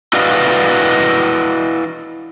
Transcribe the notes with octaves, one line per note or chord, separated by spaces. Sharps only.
E4 F#4 B4 D5 D#5 F5